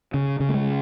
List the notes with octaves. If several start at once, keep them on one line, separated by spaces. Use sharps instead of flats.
C#3
C#3
A3
G#3